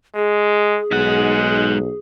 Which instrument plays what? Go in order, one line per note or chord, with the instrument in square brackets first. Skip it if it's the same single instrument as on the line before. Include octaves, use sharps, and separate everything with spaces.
[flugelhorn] G#3 [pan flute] G#4
[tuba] B1 [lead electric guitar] G#2 F#5 [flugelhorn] G#3